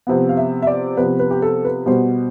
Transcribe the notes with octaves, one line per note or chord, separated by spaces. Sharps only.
C3 F3 B3
F5
E5
E5
D5
C3 F3 B3 B4
B4
G4
A4
B4
B2 G3 B3 C5